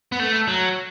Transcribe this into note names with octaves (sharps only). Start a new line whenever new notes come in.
B3
A3
F#3